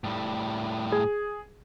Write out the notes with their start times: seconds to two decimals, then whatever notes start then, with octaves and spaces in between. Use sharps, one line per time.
0.04 A2 G3
0.92 G#4